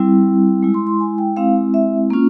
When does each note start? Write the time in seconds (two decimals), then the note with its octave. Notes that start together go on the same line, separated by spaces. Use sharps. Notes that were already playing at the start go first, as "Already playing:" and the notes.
Already playing: G3 C4 E4
0.63 G#3 E4
0.74 C6
0.87 C6
1.00 G#5
1.18 G5
1.36 G#3 C4 E4 F5
1.74 E5
2.10 A#3 C#4 F4